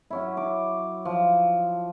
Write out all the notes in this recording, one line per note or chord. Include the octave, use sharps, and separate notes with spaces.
F#3 C#4 E4
D6
F3